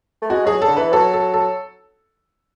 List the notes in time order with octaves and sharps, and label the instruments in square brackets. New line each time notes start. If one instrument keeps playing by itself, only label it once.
[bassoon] A3
[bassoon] G#3 [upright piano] F#4
[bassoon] F#3 [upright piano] G#4
[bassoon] D3 [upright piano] A4
[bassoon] E3 [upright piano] B4
[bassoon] F#3 [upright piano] A4
[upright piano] A4
A4